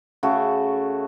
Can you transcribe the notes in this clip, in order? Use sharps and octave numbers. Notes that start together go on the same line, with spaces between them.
C#3 A3 F#4 A4